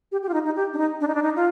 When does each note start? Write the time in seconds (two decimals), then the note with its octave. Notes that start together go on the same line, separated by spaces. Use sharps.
0.12 G4
0.23 G4
0.29 F4
0.34 D#4
0.45 D#4
0.56 G4
0.73 D4
0.78 D#4
1.01 D4
1.08 D#4
1.15 D4
1.23 D#4
1.36 F4